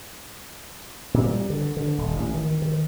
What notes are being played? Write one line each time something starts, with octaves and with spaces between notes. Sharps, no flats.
A#2
G3
D3
D3
D#1
A1
D#3
D#3